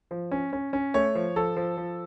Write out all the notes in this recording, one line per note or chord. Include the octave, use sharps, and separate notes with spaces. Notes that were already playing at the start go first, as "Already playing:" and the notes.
F3
C#4
C#4
C#4
A3 C#5
F3
F3 A4
F3
F3